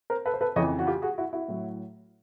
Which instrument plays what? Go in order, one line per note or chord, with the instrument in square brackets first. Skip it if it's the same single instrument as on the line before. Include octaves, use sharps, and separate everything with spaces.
[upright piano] A#4 C5
A4 B4
C5
A4 B4
F2 C#3 E3 C#5 D#5
F#4
F4 G4
F#4 G#4
E4 F#4
E4 F#4
A2 F#3